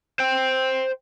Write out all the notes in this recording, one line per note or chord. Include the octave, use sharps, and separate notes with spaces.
C5 G5